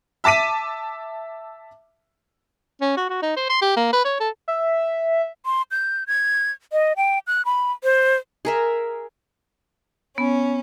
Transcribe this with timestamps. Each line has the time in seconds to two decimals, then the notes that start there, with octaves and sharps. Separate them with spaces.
0.24 E5 A5 D6 B6 D#7
2.81 C#4
2.97 F#4
3.10 F#4
3.22 D#4
3.37 C5
3.49 C6
3.62 G4
3.77 A#3
3.93 B4
4.05 C#5
4.20 A4
4.48 E5
5.46 C6
5.71 G6
6.07 G#6
6.72 D#5
6.97 G5
7.27 F#6
7.46 B5
7.84 C5
8.45 G#4 A#4 E5
10.18 B3 C#4